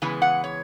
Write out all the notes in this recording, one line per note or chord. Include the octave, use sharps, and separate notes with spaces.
C#3 E3 G#3 B3
F#5
C#5